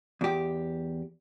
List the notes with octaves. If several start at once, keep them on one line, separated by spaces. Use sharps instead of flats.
E2 G4